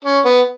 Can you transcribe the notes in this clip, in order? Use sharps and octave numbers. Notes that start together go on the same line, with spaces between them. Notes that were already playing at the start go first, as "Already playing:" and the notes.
C#4
B3